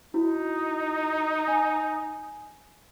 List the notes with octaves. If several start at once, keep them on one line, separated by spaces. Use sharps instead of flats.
D#4 E4 F#4
G#5